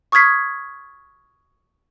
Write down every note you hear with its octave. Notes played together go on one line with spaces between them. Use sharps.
C#6 D#6 F6 G#6 B6 C7